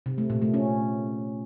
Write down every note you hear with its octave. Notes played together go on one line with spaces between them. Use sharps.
C3
A3
A#2
A3
C#4